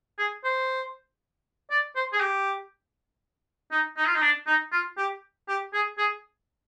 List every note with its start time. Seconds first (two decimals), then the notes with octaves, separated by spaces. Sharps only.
0.18 G#4
0.44 C5
1.70 D5
1.95 C5
2.13 G#4
2.20 G4
3.71 D#4
3.97 D#4
4.07 F4
4.15 D#4
4.22 D4
4.47 D#4
4.72 F4
4.98 G4
5.48 G4
5.74 G#4
5.98 G#4